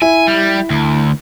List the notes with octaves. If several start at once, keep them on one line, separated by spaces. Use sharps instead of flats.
E4 G#5
G3
D2